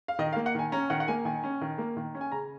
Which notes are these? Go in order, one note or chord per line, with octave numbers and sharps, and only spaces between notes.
F5
D#3 D#5
F5
A#3
F#5
D#3 G#5
C#4 A#5
D#3 F#5
F#5
A#3 G#5
D#3 G#5
C#4
D#3
A#3
D#3
C#4
G#5
C#3 A#5